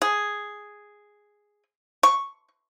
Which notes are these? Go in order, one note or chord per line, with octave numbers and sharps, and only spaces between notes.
G#4
C#6